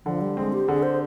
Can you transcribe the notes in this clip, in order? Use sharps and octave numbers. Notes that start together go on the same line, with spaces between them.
D3 F3
G3
G#3 C4
G4
D3 G#4
C5